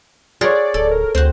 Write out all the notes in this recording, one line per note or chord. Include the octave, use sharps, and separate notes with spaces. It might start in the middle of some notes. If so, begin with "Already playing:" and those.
G#4 A#4 C#5 D5 F#5 C6
D1 A4 D5
A#4
D2 C4 F#4 C5